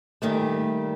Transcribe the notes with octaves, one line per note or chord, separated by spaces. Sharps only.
A#2 D#3 G3 A3